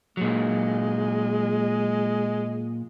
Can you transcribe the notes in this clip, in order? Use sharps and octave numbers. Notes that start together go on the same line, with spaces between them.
A#2 F#3 G#3